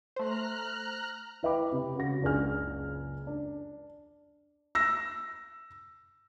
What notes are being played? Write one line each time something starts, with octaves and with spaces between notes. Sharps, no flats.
A3 C5 A#5 F6 F#6
E4 B4 D#5 G5 B5 D6
C3
C#3 F#4 A#6
F#1 C#2 D4 G#4 G#5 F6
D4
E6 A#6